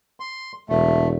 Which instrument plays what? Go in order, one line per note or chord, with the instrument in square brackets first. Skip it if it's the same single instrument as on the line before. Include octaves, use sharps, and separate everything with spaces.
[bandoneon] C6
[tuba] E1 [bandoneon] A3